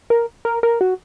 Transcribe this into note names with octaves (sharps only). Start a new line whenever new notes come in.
A#4
A#4
A#4
F#4